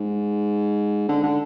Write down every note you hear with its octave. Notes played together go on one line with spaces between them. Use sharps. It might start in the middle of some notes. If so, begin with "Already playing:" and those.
Already playing: G#2
D3
D3